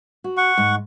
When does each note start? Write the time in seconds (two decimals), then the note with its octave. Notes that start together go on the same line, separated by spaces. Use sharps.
0.24 F#4
0.37 F#5 C#6
0.58 G#2